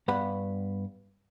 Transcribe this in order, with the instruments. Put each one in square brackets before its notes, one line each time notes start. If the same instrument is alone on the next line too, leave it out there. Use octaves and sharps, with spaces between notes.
[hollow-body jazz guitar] G2 B3 F#5 B5